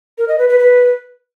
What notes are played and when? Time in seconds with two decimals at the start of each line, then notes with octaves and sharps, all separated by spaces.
0.18 A#4
0.28 D#5
0.38 B4
0.49 B4
0.59 B4